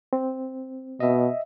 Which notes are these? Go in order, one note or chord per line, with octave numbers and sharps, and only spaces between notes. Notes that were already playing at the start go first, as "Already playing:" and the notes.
C4
B2 D#5 E5